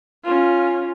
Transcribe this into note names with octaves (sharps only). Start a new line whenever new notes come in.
C#4 F4